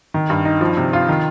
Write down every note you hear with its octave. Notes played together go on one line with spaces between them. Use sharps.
D#3
G2
D#4
F3
C3
F4
D#3